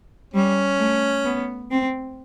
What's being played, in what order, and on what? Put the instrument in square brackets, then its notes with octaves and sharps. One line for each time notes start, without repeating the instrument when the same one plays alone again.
[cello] G3 [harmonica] C#4
[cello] A3
B3
C4